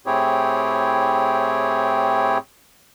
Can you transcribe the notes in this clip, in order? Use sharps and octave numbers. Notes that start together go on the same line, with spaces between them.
A2 C4 E4 G4 G#4 C#5